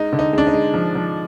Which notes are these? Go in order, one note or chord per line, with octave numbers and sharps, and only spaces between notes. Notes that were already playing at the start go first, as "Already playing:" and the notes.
Already playing: G#3 D#4
D3
D#4
G#3 D4
D#4
G#3
F3
F3